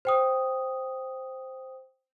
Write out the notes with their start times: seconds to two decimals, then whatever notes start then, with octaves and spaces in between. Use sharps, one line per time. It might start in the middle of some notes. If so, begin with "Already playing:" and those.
0.05 C5 G5 D#6